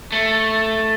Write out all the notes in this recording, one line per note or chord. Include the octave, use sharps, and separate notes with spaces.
A3